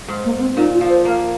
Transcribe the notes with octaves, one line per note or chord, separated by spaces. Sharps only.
G#2
A#3
A#3
C4
A#2 D#4
F4
F3
C5
A#3 A#4